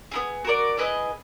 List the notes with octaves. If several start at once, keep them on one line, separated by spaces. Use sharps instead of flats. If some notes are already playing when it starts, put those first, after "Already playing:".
B3 E4 G#4
F#4 A#4 D5
E4 G#4 B4 D#5